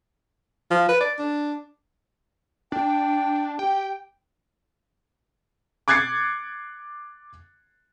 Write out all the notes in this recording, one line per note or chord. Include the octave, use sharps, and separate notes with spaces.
F3
B4
D5
D4
D4 G5
G4 G5
D6 F#6 G#6 A6 C7 C#7